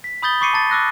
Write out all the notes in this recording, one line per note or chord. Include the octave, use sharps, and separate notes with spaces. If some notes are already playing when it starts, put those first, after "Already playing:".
B6
B5 D#6 G6 A6 G7
B5 C#6 D6 C7 C#7 D#7
A5 A#5 A6
D6 E6 F#6 A#6